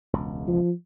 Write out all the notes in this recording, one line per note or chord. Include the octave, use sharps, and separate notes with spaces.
E1 C#2
F3